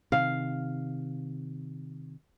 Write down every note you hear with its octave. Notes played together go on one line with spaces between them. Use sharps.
C3 D#3 F5